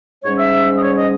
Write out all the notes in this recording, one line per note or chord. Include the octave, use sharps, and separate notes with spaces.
G#2 G3 C#4 C#5
E5
D#5
C#5
D#5